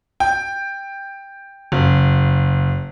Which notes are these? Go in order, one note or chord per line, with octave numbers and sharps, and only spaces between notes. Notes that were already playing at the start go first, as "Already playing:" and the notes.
G5
F#1